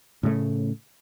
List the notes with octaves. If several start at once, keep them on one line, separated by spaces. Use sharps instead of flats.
A2 C#3 A3